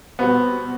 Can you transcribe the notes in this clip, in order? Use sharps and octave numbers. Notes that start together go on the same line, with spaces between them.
B2 G3 B3 C4 F#4 C5